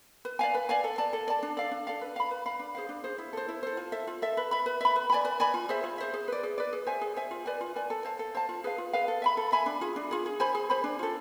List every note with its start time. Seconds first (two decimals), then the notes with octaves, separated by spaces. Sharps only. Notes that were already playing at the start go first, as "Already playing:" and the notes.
0.25 B4
0.39 D5 F5 G#5
0.54 B4
0.69 D5 F5 G#5
0.84 A4
0.98 D5 A5
1.13 A4
1.27 D5 A5
1.43 D4
1.57 A4 D5 F5
1.71 D4
1.87 A4 D5 F5
2.01 B4
2.16 F5 B5
2.31 B4
2.46 F5 B5
2.59 D4
2.75 G#4 C5 F5
2.89 D4
3.04 G#4 C5 F5
3.18 E4
3.33 A4 C5
3.48 E4
3.63 A4 C5
3.77 F4
3.92 A4 E5
4.07 F4
4.22 A4 E5
4.37 B4
4.51 E5 B5
4.66 B4
4.81 E5 B5
4.96 B4
5.10 D5 G#5 B5
5.25 B4
5.40 D5 G#5 B5
5.54 F4
5.69 G#4 C5 E5
5.84 F4
5.98 G#4 C5 E5
6.14 G#4
6.28 B4 D5
6.43 G#4
6.58 B4 D5
6.73 G#4
6.87 C5 E5 G#5
7.01 G#4
7.16 C5 E5 G#5
7.31 F4
7.46 B4 D5 G#5
7.61 F4
7.76 B4 D5 G#5
7.90 A4
8.05 C5 F5 A5
8.19 A4
8.35 C5 F5 A5
8.49 F4
8.64 G#4 B4 F5
8.78 F4
8.93 G#4 B4 F5
9.08 A4
9.22 E5 G#5 B5
9.37 A4
9.52 E5 G#5 B5
9.66 D4
9.81 F4 G#4
9.96 D4
10.11 F4 G#4
10.26 G#4
10.40 C5 G#5 B5
10.55 G#4
10.70 C5 G#5 B5
10.84 D4
10.99 F4 A4